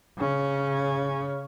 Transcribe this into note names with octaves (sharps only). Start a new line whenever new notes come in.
C#3 C#4